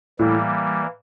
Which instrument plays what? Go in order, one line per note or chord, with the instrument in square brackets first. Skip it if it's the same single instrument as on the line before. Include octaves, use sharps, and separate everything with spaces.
[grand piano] A2 [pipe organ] E3 G3 A#3